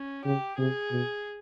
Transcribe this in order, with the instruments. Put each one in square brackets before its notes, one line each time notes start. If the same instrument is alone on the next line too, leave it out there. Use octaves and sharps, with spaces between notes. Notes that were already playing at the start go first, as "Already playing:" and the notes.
Already playing: [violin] C#4
[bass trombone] C#3 [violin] G4
[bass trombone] C3 [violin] G#4
[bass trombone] B2